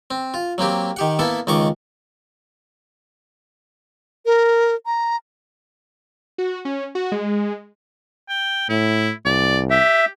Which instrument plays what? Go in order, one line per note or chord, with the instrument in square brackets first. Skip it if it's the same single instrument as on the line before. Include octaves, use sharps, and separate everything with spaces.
[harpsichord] C4
F4
F#3 A#3 C4 G4
D#3 G4 F#5
A#3 B3 E4 A4
C#2 D#3 D#5 C#6 D6
[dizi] A#4
A#5
[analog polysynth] F#4
C#4
F#4
G#3
[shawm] G5
[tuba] A2 [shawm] E4
[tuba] C2 [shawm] D5
[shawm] G4 [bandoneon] E5